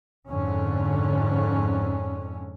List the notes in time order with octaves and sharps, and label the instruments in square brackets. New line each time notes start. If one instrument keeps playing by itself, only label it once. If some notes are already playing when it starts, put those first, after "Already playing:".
[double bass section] F2 G#2 D3 C#4